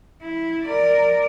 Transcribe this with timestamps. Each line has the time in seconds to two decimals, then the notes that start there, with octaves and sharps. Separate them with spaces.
0.22 E4
0.65 A#4 D5